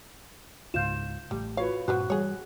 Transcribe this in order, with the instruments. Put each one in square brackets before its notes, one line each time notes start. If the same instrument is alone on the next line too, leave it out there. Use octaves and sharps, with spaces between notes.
[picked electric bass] C#2 G#2 [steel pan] F4 F5 [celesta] G6 E7
[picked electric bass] A1 A3 [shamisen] G3
[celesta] F4 F#4 [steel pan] B4 C#5 [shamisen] F5
[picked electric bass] G2 A#2 C#4 [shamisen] F3 B4 C5 [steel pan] F#4 [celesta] F#6
[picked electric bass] E3 G3 [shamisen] G#4 C#5